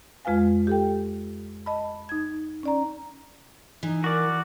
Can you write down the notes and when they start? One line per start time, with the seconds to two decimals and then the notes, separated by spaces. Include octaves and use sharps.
0.25 F2 G#3 F4 B4 F5 G#5
0.67 G4 A4 G5
1.66 D#5 A5 B5
2.09 D#4 G#6
2.63 C#4 D5 A#5
3.83 E3 D#4
4.04 F#4 A#4 D5